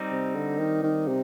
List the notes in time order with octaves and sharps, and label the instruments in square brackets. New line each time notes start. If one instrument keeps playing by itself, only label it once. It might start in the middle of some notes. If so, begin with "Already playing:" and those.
Already playing: [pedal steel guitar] G3 C4 D#4
[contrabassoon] C3
D3
D#3
D#3
C3